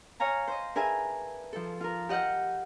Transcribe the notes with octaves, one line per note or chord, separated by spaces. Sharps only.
C#5 F5 G#5 A#5
C5 D#5
D4 G#4 A#4 B4 E5 G#5
F3 A4
F4 A#4
G4 D#5 F#5 F6 G6